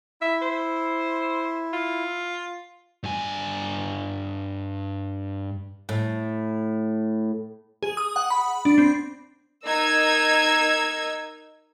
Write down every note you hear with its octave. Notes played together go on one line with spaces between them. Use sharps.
E4 E5
C5
F4
G2 G#5
A2
G#4
D#6
F#5
B5
D4
C4
D#4 A#4 E6 G#6